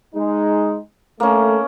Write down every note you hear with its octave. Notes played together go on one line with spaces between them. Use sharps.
G#3 D#4
A3 A#3 C#4